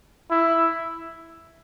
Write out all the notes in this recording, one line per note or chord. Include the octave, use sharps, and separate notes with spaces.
E4